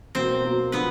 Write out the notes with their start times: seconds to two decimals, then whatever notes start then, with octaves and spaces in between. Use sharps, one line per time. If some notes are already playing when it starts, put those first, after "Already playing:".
0.15 B2 F#3 A#3 C4 C5
0.44 B2 F#3 A#3
0.72 D3 F3 B3 B4